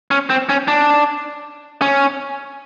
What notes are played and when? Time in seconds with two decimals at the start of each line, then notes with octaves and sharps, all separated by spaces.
0.11 C#4
0.30 C4
0.49 C#4
0.68 D4
1.82 C#4